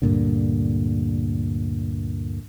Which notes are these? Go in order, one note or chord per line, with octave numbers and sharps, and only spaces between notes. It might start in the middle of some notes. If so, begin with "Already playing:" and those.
D2 G2 A#2 D3